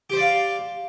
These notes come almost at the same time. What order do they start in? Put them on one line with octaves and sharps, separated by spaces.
G4 C5 D5 F5